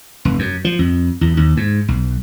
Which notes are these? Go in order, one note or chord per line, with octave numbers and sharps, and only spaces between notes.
F1
F#2
F3
F2
E2
D#2
G#2
B1